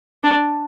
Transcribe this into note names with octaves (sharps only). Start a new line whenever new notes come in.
D4